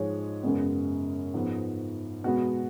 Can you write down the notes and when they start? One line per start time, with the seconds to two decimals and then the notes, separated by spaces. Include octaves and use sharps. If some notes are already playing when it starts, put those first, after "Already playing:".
Already playing: G#2 F3 G#3 C#5
0.43 F#2 C#3 G#3 B3
1.34 G#2 F3 G#3 B3
2.24 B2 G#3 B3 F#4